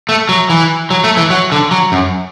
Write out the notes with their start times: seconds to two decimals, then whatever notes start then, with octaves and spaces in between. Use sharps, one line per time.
0.09 A3
0.29 F#3
0.50 E3
0.90 F#3
1.04 A3
1.17 E3
1.30 F#3
1.52 D3
1.71 F#3
1.92 F#2